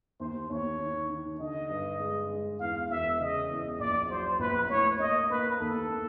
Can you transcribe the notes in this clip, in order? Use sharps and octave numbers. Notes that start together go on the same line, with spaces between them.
D#2 C5
D#2 C#5
D#3
D#3
D3 D#5
G2
G#3
G#3
E2 F5
E1 E5
C#3 D#5
E2
A#1 D5
F#3 C5
A#1 B4
A2 C#5
A#3 D#5
A#3 B4
D#2 A4
A#3